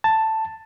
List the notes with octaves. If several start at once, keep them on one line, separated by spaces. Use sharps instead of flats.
A5